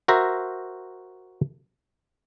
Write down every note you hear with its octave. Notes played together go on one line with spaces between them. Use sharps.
F#4 A#4 C5 E5 A#5